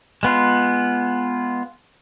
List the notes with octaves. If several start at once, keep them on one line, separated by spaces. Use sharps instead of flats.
G#3 B3 F4